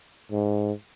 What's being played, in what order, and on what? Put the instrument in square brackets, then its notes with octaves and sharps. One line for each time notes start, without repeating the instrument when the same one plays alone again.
[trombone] G#2